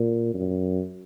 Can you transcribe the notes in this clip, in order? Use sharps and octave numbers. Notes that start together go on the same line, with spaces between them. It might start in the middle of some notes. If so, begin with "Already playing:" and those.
Already playing: A#2
F#2